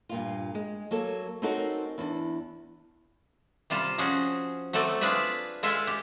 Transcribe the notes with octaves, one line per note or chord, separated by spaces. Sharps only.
G2 A#2 F4
G#3
F#3 A#3 A4
C4 C#4 D#4 F#4 A4 A#4
E2 D4
C3 G3 F4 A5
F3 C#4 F#4 G#4
F#3 A3 C4 A4 D5
D4 F4 G#4 B4 D5 E5
G#3 F4 G#4 A4 E5 G#5
G4